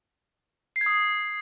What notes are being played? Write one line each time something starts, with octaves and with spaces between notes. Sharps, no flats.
C7
G#6
D#6